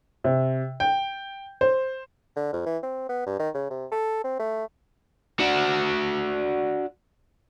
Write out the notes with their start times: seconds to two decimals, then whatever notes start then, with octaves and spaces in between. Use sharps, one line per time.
0.24 C3
0.80 G5
1.61 C5
2.36 D3
2.53 F2
2.66 E3
2.83 C4
3.09 B3
3.26 G2
3.39 D#3
3.54 C#3
3.70 C3
3.91 A4
4.24 C4
4.39 A3
5.39 D4 F#4